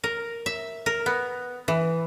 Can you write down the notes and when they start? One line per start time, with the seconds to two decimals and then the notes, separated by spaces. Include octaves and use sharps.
0.04 A#4
0.46 E5
0.86 A#4
1.06 B3
1.68 E3